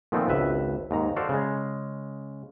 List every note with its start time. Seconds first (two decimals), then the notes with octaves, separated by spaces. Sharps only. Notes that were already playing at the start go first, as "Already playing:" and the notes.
0.12 A#2 D#3 F3 A3 B3 C4
0.28 G#1 C#2 B4 E5
0.91 D#2 G#2 A#5
1.16 F#4 A4 C5 D5 F5
1.29 C#3 G#3